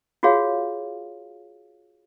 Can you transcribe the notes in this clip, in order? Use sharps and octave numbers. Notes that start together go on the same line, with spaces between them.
F4 F#4 G#4 C#5 F5